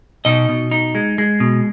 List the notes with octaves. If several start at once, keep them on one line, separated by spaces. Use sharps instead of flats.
B2 D#4 D#5
B2
D#4
G#3
G#3
B2